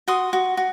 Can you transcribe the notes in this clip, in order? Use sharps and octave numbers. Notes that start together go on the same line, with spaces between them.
F#4 C6 D#6
F#4
F#4